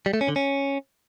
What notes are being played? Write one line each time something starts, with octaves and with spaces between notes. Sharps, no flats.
G3
A3
C#4
D3
C#4